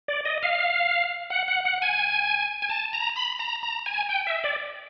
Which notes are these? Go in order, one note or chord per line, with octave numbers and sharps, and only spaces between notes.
D5
D#5
F5
F#5
F#5
F#5
G#5
G#5
A5
A#5
B5
A#5
A#5
G#5
G5
E5
D5